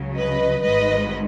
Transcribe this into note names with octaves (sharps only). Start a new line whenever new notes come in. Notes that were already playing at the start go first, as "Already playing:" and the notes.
Already playing: C#2 C#3 F#3
B4 D#5
G#1 G#2 D#3 G#3 B4 D#5